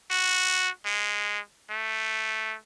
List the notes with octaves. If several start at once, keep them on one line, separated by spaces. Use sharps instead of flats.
F#4
G#3
A3